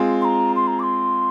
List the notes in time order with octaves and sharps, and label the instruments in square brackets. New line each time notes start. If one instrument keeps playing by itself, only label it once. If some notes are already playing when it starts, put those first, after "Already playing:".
Already playing: [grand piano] G#3 C4 F4 G#4
[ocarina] C6
A#5
C6
A#5
D6
C6